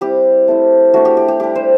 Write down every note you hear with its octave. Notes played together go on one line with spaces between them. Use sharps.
G3 C4 E4 G4
A3 C4 E4
A3 D4 F#4
G4
G4
G4
G3 D4 G4
C5